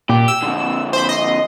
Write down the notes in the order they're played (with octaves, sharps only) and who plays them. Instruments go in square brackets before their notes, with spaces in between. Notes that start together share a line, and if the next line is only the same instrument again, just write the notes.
[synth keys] A#2 [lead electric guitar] G4
[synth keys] E6
[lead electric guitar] F2 D3
[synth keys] C5 B5
D#5 C6